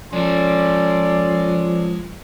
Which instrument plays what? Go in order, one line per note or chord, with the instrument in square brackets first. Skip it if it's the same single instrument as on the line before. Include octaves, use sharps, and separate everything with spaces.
[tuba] F3 [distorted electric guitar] G#3 A5 [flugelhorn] C#4 [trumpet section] A4 D5 C6